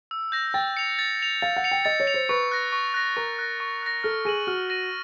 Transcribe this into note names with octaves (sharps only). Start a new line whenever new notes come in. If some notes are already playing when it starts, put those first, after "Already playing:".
E6
G6 A#6
G5 A6
C#7 F7
A6
C#7 F7
F5 A6
F#5
C#7 F7
G5
D#5 A6
C#5
C#7 F7
C5
B4 C#6
F#6 A#6
C#6
F#6 A#6
A#4 C#6
F#6 A#6
C#6
F#6 A#6
A4 F6
G#4 A#6 D#7 F#7
F#4 F6
A#6 D#7 F#7